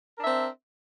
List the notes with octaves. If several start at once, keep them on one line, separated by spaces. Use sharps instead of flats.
C4 D4 A#4 E5